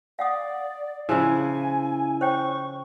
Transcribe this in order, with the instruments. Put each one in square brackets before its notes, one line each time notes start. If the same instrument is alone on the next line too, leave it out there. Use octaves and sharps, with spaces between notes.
[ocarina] D5 [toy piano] F5 F#5 D#6
[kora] C#3 F3 [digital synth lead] E4 [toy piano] G#4 C5 E6 [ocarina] G#5
[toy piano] C5 C#5 G5 [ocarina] C#6